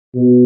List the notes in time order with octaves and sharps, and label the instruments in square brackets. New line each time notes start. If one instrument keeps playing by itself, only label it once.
[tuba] B2